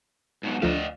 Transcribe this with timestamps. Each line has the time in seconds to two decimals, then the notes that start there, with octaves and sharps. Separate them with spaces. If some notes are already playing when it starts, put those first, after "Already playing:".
0.43 G#2 B2 F#3
0.62 D2 F3 A3 D5 D#5 F5